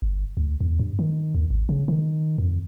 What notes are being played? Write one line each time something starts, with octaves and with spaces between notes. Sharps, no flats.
G1
D2
E2
G2
D#3
D#2
G#1
C#3
D#3
F2